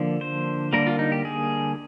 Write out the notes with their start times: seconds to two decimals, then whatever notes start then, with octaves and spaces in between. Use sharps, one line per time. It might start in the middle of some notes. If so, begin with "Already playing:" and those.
Already playing: D3 F3 A#3
0.21 C5
0.73 D3 G3 A#3 A#4
0.87 F4
0.99 D#4
1.12 G4
1.25 G#4